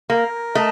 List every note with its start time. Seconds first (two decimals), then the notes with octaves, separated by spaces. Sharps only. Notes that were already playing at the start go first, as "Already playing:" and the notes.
0.10 A#3 A#4
0.55 A3 D#5